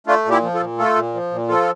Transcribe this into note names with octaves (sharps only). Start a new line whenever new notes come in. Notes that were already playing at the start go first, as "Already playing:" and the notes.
A3 D4 F4
A#2
E4 G4
F3
F4 A4
A#2
A3 F4 A4
A#2
F3
A#2
F3 F4 A4